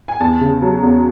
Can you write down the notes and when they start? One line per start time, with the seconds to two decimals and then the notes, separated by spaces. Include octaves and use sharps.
0.08 G#5
0.20 E2 A5
0.41 C#3
0.62 F#3
0.83 E2